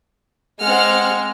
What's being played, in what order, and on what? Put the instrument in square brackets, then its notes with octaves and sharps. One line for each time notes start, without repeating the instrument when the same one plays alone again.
[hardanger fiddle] G#3 [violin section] C4 F#5 F6